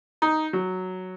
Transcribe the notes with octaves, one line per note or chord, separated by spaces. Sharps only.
D#4
F#3